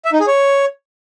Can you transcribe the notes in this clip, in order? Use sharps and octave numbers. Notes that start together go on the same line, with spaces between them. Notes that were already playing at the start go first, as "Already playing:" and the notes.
E5
D#4
G#4
C#5